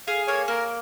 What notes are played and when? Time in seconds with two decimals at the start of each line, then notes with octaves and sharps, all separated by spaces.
0.07 G#4 F5
0.28 A#3 C#5
0.48 A#3 A#4